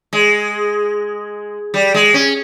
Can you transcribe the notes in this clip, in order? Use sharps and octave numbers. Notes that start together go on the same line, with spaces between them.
G#3
G3
G#3
C#4